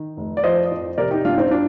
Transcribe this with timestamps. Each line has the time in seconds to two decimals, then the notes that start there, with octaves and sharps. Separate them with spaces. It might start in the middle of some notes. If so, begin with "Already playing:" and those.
Already playing: D#3
0.17 F1
0.37 D5
0.44 F3 C5 D#5
0.72 F2
0.98 C3 A#4 D5
1.11 D#4 G4
1.24 G1 D4 F4
1.38 C4 D#4
1.51 D4 F4